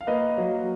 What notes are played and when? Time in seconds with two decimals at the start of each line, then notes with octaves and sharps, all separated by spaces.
0.01 F5
0.07 A#3 B4 D#5
0.38 F#3